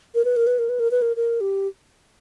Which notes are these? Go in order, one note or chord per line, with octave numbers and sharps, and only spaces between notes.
A#4
B4
A#4
B4
A#4
B4
A#4
B4
A#4
A#4
G4